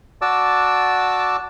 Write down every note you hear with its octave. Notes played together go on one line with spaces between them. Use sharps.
F#4 D5 A5 D6 E6